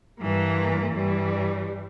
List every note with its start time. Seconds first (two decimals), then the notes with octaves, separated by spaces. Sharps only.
0.20 G2 E3 A#3
0.94 G2 E3 G3